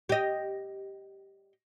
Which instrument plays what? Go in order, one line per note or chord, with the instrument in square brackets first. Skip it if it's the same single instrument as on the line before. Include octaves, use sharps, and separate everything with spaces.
[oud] G4 D#5